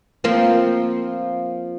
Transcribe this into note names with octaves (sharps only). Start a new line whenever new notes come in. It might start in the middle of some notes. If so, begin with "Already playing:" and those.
F3 A#3 C4